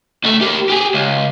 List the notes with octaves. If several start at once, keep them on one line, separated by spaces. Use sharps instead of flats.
C#2 A3
A#3 G4
G4 G#4
C#2